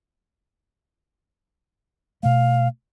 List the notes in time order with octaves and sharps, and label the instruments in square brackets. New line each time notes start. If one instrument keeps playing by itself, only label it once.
[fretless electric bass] B2 A3 [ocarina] F5